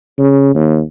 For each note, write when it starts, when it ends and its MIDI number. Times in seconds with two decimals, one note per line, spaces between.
0.18 0.51 49
0.55 0.81 39